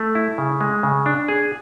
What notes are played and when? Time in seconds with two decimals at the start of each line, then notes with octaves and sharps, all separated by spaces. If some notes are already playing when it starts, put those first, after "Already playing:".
Already playing: A3
0.15 E4
0.38 C#3
0.61 G#3
0.83 C#3
1.06 D4
1.28 G#4